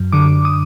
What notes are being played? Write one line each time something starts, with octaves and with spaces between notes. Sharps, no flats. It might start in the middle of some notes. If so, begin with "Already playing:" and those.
Already playing: F#2
D3 D6
D#6